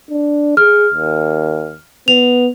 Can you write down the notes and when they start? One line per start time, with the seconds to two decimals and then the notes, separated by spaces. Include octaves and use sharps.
0.10 D4
0.57 G#4 F6
0.94 D#2
2.08 B3 F7